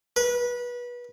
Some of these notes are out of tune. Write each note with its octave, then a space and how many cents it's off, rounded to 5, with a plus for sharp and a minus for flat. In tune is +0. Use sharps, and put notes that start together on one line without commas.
B4 -25